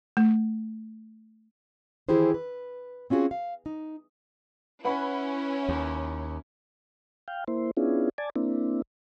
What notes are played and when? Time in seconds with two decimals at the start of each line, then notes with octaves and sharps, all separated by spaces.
0.17 A3
2.09 D#3 E3 E4 G4 G#4 C5
2.34 B4
3.10 C4 C#4 F4 F#4 G#4
3.31 F5
3.66 D#4
4.85 C#4 E4 B4 F#5 B5
5.69 D#2
7.28 F5 G5
7.48 A#3 E4 C5
7.77 B3 C#4 D4 E4 F4 G#4
8.18 D5 G#5 A5
8.36 A#3 C4 D4 E4